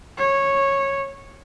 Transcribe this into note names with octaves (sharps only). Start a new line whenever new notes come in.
C#5